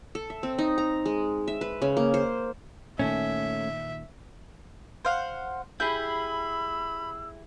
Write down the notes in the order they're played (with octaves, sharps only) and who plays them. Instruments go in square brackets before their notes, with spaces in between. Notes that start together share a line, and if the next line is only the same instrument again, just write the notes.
[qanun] A4
E5
C4
D#4
A#5
G#3
E5
B4
C#3
A#3
C5
[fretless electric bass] A#2 D#3 [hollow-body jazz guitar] A3 C#4 [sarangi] E5
[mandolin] C5 F5 F#5
[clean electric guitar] E4 G4 G#4 [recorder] B5 [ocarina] E6 [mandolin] G6